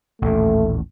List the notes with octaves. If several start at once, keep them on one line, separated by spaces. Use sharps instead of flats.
A1 D#2 A#2 A3